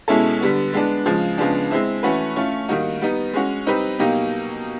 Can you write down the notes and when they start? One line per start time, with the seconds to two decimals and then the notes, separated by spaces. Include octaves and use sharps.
0.08 B2 G#3 C#4 E4 A4
0.41 D3 G3 B3
0.73 G#3 B3 D4
1.06 C#3 F3 G#3
1.38 C#3 F3 G#3 B3 D4
1.71 G#3 C4 E4
2.03 E3 A3 C#4 F#4 B4
2.36 A3 C#4 F4
2.69 D#3 G3 A#3 D#4 F#4
3.01 G3 B3 D#4
3.33 G#3 C#4 F#4
3.66 G3 C4 D#4 G4 B4
3.99 B2 F#3 A#3 D#4 G4